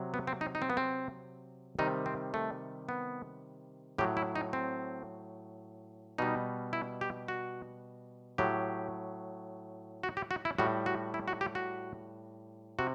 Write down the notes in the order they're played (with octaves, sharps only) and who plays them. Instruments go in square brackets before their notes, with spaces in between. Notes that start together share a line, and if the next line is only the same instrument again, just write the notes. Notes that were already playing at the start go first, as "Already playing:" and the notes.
Already playing: [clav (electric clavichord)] C3 F#3
B3
C4
D#4
D#4
C4
B3
C4
C3 D#3 G3 D#4
C4
A3
B3
A2 F#3 G4
E4
D#4
C4
B2 G3 D#4
E4
G4
F#4
A2 F#3 G4
F#4
G4
F#4
E4
A2 G3 F#4
F#4
E4
F#4
G4
F#4
C3 F#4